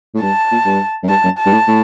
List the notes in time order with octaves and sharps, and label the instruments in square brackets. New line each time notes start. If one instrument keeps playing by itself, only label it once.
[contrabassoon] A2
[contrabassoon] G2 [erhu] A5
[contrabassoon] A#2
G2
F#2
[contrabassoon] G2 [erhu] A5
[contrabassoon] F#2
[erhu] A5
[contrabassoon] G2
A2
A2